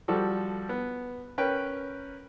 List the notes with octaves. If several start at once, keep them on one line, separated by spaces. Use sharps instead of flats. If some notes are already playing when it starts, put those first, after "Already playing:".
F3 G3 F#4 A4
B3
C#4 A#4 B4 G5